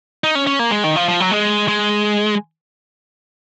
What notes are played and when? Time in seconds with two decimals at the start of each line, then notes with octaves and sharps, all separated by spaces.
0.24 D#4
0.35 C#4
0.47 C#4
0.59 A#3
0.71 G#3
0.84 D#3
0.96 F3
1.08 F3
1.20 F#3
1.31 G#3
1.68 G#3